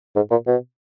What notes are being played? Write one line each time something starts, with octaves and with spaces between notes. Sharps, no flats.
G#2
A#2
B2